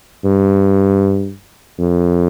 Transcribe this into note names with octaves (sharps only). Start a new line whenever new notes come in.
G2
F2